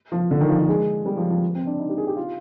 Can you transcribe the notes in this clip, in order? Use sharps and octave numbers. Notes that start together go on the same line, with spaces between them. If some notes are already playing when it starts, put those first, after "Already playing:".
F3
D3
D#3
F3
F3
G#3
G3
F3
F3
C4
D4
D#4
G4
G#4
G4
F4